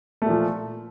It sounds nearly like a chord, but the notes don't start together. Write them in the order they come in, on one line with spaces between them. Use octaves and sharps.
A3 A#2 F3